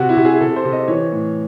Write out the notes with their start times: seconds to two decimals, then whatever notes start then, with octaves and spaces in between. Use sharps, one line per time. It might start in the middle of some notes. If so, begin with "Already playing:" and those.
Already playing: C3 F#4
0.09 E4
0.17 C3
0.25 G#4
0.41 C3 A4
0.56 C5
0.65 C3
0.73 D#5
0.88 E3 C#5
1.13 A2